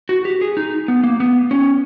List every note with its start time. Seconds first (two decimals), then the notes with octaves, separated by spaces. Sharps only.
0.09 F#4
0.25 G4
0.41 G#4
0.57 D#4
0.88 B3
1.04 A#3
1.20 B3
1.51 C#4